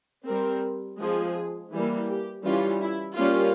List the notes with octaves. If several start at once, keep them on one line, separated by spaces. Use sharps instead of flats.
G3 C4 A#4
F3 G#3 C4 G#4
E3 G3 A#3
G4
E3 G3 C#4 F4
E4
G3 A#3 C#4 F4